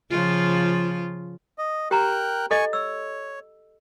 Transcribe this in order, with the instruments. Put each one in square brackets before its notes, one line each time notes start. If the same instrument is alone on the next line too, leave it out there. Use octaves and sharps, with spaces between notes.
[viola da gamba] C#3 F3 F4
[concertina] D#5
[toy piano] G4 A#5 [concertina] A#4 G5 F#6
[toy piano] A4 D#5 [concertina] G#5 C#6
[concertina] C#5 [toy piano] E6